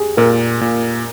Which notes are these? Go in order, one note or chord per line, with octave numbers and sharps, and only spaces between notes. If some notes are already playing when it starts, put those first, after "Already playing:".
Already playing: G4 G#4
A#2 A#4
A#2